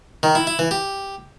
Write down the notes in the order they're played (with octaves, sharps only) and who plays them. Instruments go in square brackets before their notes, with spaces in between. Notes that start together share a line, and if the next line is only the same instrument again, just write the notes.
[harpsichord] D#3
E4
E4
E3
G4